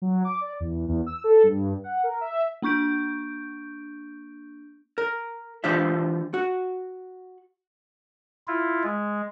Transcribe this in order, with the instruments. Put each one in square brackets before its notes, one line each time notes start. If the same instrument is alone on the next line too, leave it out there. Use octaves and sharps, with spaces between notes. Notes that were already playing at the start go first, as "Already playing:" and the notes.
[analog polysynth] F#3
D6
D5
E2
E2
E6
A4
G2
F#5
A#4
E5
[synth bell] A#3 D4 C#6 G6 D7
[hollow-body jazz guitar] A#4
E3 D4 F4 G4 C5 E5
F#4
[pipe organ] E4 F4
G#3